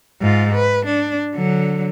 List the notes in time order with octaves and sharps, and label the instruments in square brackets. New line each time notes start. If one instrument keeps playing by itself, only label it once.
[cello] G#2 F4
B4
D4
D3 F#3